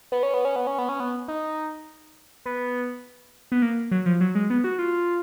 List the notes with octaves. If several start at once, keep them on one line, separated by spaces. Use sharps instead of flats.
B3
C#4
B3
C#4
B3
C#4
B3
C#4
B3
D#4
B3
B3
A#3
F#3
F3
F#3
G#3
B3
F#4
F4